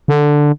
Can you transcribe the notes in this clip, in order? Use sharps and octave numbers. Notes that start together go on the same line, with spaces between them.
D3